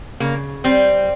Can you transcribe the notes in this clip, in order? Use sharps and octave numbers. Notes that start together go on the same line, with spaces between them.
C#3 A#3
G3 C4